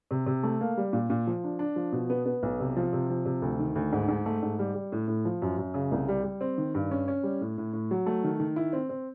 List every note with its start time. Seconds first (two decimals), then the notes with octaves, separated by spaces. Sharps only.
0.11 C3
0.26 C3
0.43 A3
0.61 A#3
0.77 G3
0.93 A#2
1.10 A#2
1.27 F3
1.44 D4
1.59 D4
1.76 F3
1.92 B2
2.10 B3
2.26 B3
2.43 B1
2.60 C3
2.77 F3
2.93 C3
3.10 F3
3.25 C3
3.42 D2
3.59 D#3
3.75 D2
3.92 G#2
4.08 G#2
4.26 A3
4.42 G#2
4.59 G3
4.75 G3
4.92 A2
5.08 A2
5.25 F3
5.42 F#2
5.58 F#2
5.74 C#3
5.91 C2
6.08 G3
6.24 G3
6.41 C4
6.58 D#3
6.75 G2
6.91 C#4
7.08 C#4
7.23 G3
7.41 A2
7.58 A2
7.73 A2
7.91 F#3
8.06 A3
8.24 D#3
8.40 D#3
8.56 E4
8.73 C4
8.89 C4